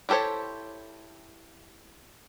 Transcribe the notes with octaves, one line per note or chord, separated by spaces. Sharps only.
E4 G4 A4 C5 C#5